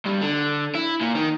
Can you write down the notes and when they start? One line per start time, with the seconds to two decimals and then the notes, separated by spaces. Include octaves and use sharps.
0.06 G2
0.22 D3
0.75 E4
1.01 A#2
1.15 D#3